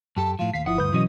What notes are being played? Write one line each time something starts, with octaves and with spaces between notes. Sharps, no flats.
F#2 G4 A4 A5
A2 F3 F5
D#2 F5 B6 C7
G1 F3 E4 F#5 D#6
D2 G2 B4 G6
B1 E3 F#3 C#4 D#5